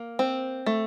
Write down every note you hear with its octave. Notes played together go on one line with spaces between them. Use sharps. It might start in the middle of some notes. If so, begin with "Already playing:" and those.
Already playing: A#3
C4
A3